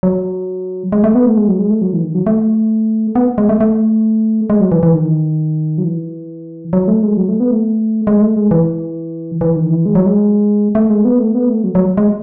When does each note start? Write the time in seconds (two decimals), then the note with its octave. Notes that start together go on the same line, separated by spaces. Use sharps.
0.03 F#3
0.92 G#3
1.04 A3
1.15 B3
1.26 A3
1.37 G#3
1.48 F#3
1.59 G#3
1.70 A3
1.82 F#3
1.93 E3
2.04 D#3
2.15 F#3
2.27 A3
3.15 B3
3.38 G#3
3.49 A3
3.61 A3
4.50 G#3
4.61 F#3
4.72 E3
4.83 E3
4.95 D#3
5.78 F#3
5.84 E3
6.73 F#3
6.88 A3
7.03 G#3
7.17 F#3
7.29 A3
7.40 B3
7.51 A3
8.07 G#3
8.22 A3
8.37 G#3
8.51 E3
9.41 E3
9.56 D#3
9.71 E3
9.86 G#3
9.95 F#3
10.06 G#3
10.75 A3
10.90 G#3
11.05 B3
11.19 A3
11.35 B3
11.50 A3
11.64 F#3
11.75 F#3
11.97 G#3